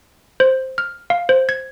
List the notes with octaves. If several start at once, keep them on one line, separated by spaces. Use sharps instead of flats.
C5
F6
F5
C5
G#6